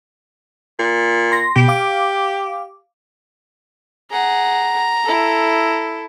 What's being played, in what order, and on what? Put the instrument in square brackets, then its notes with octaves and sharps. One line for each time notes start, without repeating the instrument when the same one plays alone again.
[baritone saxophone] A#2
[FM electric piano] C6 A#6
[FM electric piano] B2 [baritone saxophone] G4
[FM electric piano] F5 D6
[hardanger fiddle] G#4 F#5 [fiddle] A#5
[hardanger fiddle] E4 A4